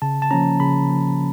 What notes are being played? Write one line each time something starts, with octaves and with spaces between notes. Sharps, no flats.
C#3 A5
A5
F3 A#3 C#4 A#5
C#3 B5
F3 A#3 C#4